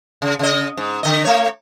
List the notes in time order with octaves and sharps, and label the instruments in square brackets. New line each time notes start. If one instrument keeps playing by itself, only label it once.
[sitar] C#3
C#3 D#5
G#2
D3 D#5
A3 C#5